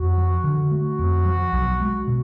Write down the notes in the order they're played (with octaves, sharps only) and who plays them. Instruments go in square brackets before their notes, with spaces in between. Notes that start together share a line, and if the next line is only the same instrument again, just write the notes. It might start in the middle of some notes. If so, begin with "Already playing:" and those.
Already playing: [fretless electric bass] F2 [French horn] F#4
[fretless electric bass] F3
D3
[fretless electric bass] A3 [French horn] F#4
[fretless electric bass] F2
F3
B1
G#3
B2